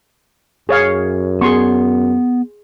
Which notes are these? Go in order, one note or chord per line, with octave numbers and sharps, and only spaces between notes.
F#2 G#4 C#5 F5
B3 G#4 C6 C#6